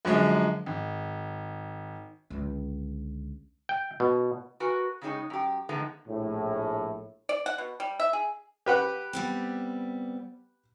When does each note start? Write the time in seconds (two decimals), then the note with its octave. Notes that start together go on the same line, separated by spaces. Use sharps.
0.05 F#2 D3 F3 F#3 G#3
0.66 G#1
2.30 C#2 D3
3.69 G5
4.00 B2
4.60 F#4 A#4 B4 G#5
5.01 C#3 G3 G#3 D#4 C#5
5.30 F#2 G4
5.69 D3 D#3 F3 G#3 A3 B3
6.06 A#1 A2
7.29 D5
7.46 F#5
7.58 B2
7.80 G3
8.00 E5
8.13 G#4
8.66 G4 B4 F#5
9.13 G3 B3 C4